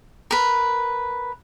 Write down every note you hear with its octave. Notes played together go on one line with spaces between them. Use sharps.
A#4 B4